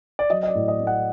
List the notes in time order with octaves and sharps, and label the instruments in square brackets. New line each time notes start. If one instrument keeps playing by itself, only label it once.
[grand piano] D5
F#3 D#5
D#5
D5
A2
D#5
A3
F#5